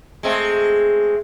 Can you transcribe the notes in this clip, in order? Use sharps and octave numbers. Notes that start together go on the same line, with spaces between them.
G#3 A3 C4